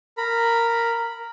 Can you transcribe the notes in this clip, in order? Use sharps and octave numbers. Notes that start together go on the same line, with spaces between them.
A#4 B5